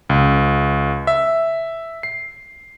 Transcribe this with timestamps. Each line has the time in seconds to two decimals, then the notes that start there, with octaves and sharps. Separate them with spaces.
0.10 C#2
1.07 E5
2.03 C7